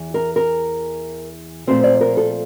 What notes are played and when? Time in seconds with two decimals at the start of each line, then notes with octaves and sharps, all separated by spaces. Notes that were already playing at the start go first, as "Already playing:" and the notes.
Already playing: E2 E3
0.14 A#4
0.36 A#4
1.67 A#2 F3 A3 C4 C5
1.84 D5
2.01 A#4
2.17 A4